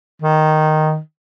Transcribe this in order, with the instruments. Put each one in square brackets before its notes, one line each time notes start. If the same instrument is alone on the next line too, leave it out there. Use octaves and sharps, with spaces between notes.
[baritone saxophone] D#3